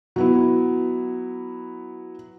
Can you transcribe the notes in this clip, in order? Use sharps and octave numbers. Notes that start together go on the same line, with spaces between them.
F#3 B3 E4